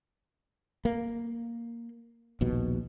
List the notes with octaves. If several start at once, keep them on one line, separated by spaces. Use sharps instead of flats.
A#3
A#1 D#2 B2